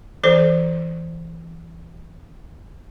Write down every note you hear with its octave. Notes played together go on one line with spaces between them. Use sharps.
E3 A4 C5